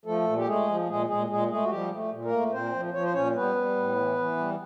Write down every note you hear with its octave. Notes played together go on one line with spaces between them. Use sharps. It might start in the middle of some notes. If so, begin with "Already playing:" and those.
F3 A3 A4
A#2
G4
G#3 A3 G#4
F3
A#2 G#3 G#4
A#2 G#3 G#4
A#2 G#3 G#4
G#3 A3 G#4
F#4
F3 G3 G4
A3
A#2
A#3 A#4
A3
A#2 C4 C5
F3
F3 C#5
C5
A#2 C#4 C#5
G3 B3 B4
G3
A2
E3
E3
G3